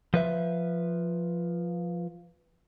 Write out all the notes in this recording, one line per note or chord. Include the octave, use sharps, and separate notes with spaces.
F3 B4 E5